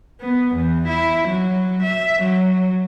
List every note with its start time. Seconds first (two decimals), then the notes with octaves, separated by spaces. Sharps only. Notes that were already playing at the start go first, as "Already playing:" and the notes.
0.21 B3
0.56 E2
0.89 E4
1.29 F#3
1.84 E5
2.23 F#3